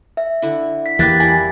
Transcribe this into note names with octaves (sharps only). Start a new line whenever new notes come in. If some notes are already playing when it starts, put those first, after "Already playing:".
E5
D3 E4
B6
E2 E3 A#3 E4 G4 F#6 A6 B6
G3 E4 G#5